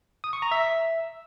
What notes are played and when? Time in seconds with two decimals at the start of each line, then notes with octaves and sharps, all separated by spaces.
0.24 D#6
0.33 C#6
0.42 A#5
0.52 E5